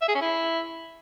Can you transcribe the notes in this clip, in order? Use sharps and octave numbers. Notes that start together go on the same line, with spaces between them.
E5
G#4
C#4
E4